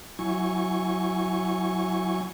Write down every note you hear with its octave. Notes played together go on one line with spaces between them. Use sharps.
F#3 E4 G#5 C#6